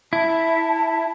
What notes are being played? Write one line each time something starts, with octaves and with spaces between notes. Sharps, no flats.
E4 A5